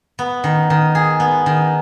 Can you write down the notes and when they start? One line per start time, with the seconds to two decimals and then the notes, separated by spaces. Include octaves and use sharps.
0.19 B3
0.44 D#3
0.70 D#3
0.95 G#4
1.20 B3
1.46 D#3